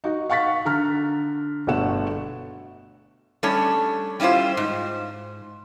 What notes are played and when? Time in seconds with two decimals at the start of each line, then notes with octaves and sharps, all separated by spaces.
0.04 D#4 F#4
0.30 F5 F#5 C#6 A6 B6
0.65 D3 A#5 F6
1.67 G1 B2 A3 C#5 F#5 E7
3.43 G3 A3 C#4 D4 C#5
4.20 G3 C#4 E4 F4 C5
4.57 G#2